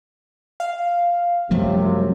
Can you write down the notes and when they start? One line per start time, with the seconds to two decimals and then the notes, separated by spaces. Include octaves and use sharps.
0.60 F5
1.51 F#2 C3 F3 G3 A3